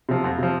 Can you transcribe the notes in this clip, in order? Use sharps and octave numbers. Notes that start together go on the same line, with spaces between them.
C3 F3
F2
C3 F3